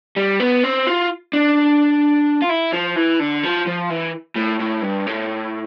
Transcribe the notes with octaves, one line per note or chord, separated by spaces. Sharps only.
G3
B3
C4
F4
D4
F4
E4
F3
E3
D3
F3
F3
E3
A2
A2
G2
A2